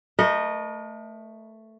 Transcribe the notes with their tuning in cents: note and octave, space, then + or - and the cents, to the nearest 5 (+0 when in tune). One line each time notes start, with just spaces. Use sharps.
A3 +5 A#4 +40 D#5 -15